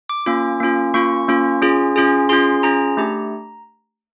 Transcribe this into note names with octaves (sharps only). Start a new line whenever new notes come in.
D6
A#3 C#4 F4
A#3 C#4 F4
A#3 C#4 F4 C#6
A#3 C#4 F4
C#4 F4 G#4
C#4 F4 G#4
C#4 F4 G#4 C6
C#4 F4 G#4 A#5
A3 D4 G4